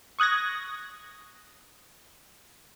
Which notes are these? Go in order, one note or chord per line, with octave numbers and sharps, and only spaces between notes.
C#6 D#6 F#6 G#6 A#6